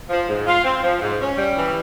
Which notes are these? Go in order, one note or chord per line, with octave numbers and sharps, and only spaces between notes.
F3
G#2
F4
C4
F3
G#2
C#4
G3
E3